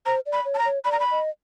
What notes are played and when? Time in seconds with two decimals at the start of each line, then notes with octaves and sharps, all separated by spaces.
0.06 C5 A#5
0.26 D5
0.33 B5
0.45 C#5
0.55 A5
0.58 A#5
0.65 C#5
0.85 D5 B5
0.92 A#5
1.00 B5
1.11 D#5